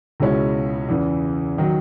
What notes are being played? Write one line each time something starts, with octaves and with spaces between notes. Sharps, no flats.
C#2 B2 G#3 C#4 E4
E2 C#3 E3
D#3 F#3